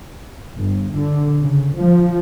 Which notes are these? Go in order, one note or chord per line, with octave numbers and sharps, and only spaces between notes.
G1
D3
C#3
F3